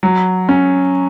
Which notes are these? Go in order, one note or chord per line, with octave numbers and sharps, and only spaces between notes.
F#3
C#4